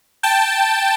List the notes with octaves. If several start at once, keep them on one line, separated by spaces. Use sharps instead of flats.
G5 A5